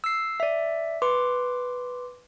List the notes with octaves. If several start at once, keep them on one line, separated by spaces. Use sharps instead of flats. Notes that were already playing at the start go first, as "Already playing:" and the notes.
E6 C7
D5 E5
B4 C6 D6